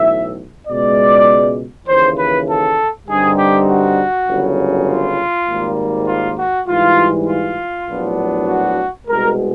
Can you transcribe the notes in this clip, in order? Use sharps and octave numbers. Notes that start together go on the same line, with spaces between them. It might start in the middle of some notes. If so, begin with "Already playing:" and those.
Already playing: B1 A2 E3 E5
C#2 B2 G#3 B3 D5
D#2 C#3 E3 C5
B4
A4
G2 D3 G3 C4 D#4 G#4
G4
F#4
G1 F#2 C#3
F4
G#1 G#2 D#3 G3 A#3
F4
F#4
G#2 E3 G3 F4
F4
A#1 A2 F#3 B3 D4
F#4
C2 B2 G#3 A#4